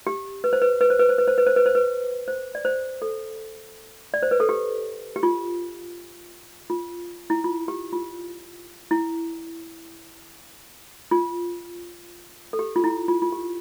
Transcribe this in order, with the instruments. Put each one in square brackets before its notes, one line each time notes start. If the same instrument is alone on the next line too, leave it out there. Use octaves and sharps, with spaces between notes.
[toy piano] G4
B4
C5
B4
B4
C5
B4
C5
B4
C5
B4
C5
B4
C5
B4
C5
D5
C5
A4
D5
C5
B4
A4
G4
G4
F4
F4
E4
F4
G4
F4
E4
F4
A4
G4
F4
E4
F4
F4
G4